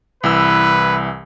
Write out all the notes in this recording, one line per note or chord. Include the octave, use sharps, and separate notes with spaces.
C2 E3 B4 E6